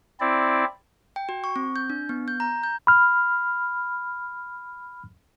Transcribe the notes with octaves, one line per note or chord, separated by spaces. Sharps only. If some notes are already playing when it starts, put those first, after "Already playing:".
C4 E4 D5
G5
F#4
C#6
C4
G6
D4
B3
G6
A#5
G6
B5 F6